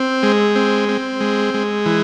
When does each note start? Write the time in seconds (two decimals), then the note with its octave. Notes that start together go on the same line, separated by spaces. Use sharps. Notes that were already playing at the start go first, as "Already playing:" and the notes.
Already playing: C4
0.23 G#3
0.56 C4
0.89 C4
1.20 G#3
1.54 G#3
1.86 E3